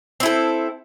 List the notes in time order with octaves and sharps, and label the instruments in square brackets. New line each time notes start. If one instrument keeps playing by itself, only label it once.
[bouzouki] C4
E4
A4